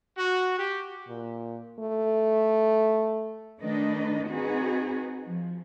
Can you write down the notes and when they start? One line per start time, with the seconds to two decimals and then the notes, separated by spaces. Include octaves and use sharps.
0.17 F#4
0.59 G4
1.08 A#2
1.79 A3
3.61 D#3 A3 D4 D#4 B4 D#5
4.29 C4 D#4 F#4 G#4 B4
5.25 F3